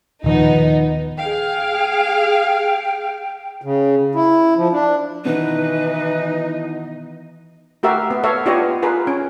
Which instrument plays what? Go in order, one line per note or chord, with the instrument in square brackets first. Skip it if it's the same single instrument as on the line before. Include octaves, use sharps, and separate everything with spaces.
[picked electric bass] D#1 D#3 F3 [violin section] B3 D#4
[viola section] G#4 F5 [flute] G5
[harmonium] C#3
E4
F3
D4
[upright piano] B2 D#3 B3 [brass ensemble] E3 [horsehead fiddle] D#4 [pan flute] B4
[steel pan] A3 F#4 G4 A#4 E5 F5
B3
A4 C#5 E5 F5
B3 D4 F4 G4 C#5 D#5
F4 G#4 A#4 B4
C#4